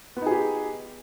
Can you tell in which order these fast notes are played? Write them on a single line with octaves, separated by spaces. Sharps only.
B3 D#4 G#4 G4